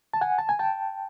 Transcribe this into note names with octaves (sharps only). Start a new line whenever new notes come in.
A5
F#5 G#5
A5
G#5
G5 A5